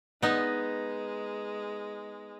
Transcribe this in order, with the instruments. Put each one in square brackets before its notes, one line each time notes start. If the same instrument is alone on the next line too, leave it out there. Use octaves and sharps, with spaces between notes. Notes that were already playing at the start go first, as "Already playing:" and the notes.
[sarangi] G#3 [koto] B3 D#4